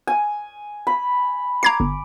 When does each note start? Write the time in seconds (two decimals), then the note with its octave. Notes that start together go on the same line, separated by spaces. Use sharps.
0.07 G#5
0.87 B5
1.63 A#5 D6 G#6 C7
1.80 G1